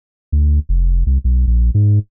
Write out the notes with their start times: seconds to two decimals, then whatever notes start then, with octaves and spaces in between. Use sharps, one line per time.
0.32 D2
0.69 F1
1.06 C2
1.24 B1
1.47 A#1
1.74 G#2